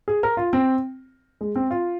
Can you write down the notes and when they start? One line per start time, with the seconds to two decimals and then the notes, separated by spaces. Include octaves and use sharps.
0.08 G#4
0.23 A#4
0.37 F4
0.53 C4
1.41 G#3
1.55 C4
1.71 F4